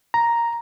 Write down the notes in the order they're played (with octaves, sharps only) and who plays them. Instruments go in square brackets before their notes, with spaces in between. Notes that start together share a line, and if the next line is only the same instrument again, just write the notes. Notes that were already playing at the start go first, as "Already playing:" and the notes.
[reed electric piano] A#5